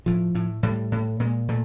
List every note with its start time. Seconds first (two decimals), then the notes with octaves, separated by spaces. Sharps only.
0.06 A2 F3
0.35 A2
0.63 A2 G3
0.92 A2
1.20 A#2 G#3
1.48 A#2 A3